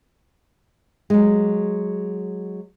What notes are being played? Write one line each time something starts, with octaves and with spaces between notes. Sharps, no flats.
F#3 G#3